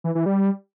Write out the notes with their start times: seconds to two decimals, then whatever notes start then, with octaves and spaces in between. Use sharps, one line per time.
0.04 E3
0.15 E3
0.26 G3